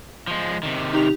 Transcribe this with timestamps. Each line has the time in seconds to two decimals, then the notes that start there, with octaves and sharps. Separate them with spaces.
0.27 F3 G#3
0.63 C3 D#3
0.93 D#4 G4 F7